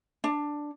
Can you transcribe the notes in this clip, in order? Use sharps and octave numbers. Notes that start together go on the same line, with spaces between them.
D4